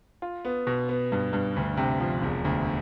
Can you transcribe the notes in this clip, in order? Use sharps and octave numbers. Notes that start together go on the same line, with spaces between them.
F4
B3
B2
B3
G2
G2
D2
C3
F3
E1
D2